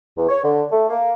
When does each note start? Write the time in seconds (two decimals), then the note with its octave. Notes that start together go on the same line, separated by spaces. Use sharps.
0.17 E2
0.29 C#5
0.43 D3
0.71 A3
0.89 A#3